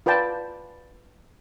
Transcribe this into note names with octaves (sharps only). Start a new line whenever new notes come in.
F4 B4 D5 G5 A5